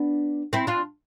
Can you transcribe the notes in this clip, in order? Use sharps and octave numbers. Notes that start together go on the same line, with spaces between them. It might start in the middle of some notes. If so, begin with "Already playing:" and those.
Already playing: B3 D4
C4 E4
D4 F4